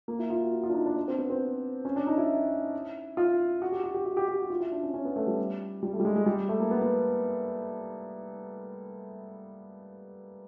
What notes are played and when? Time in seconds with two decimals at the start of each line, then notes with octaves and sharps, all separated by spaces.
0.08 A#3
0.19 E4
0.30 F4
0.42 F#4
0.52 F#4
0.64 F4
0.69 D4
0.74 D#4
0.85 D4
0.96 D4
1.08 C4
1.18 B3
1.30 C4
1.85 C#4
1.96 D4
2.07 D#4
2.18 E4
3.17 F4
3.62 F#4
3.72 G4
3.84 F#4
3.94 G4
4.06 F#4
4.17 G4
4.28 G4
4.39 F#4
4.50 F4
4.61 E4
4.72 D4
4.83 C#4
4.94 C#4
5.05 B3
5.16 A3
5.27 G3
5.83 G3
5.93 A3
6.00 G3
6.05 G#3
6.16 G#3
6.26 G3
6.49 A3
6.60 A#3
6.71 B3
6.82 B3